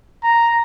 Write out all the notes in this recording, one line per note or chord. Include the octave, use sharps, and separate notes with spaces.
A#5